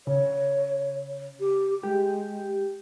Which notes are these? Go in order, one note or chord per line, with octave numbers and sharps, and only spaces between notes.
C#3 C#5
G4
G#3 G4